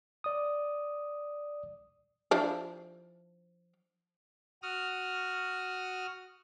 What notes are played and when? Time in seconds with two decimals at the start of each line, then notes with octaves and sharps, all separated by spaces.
0.24 D5 D#6
2.31 F3 D4 E4
4.62 F#4 D#6 F6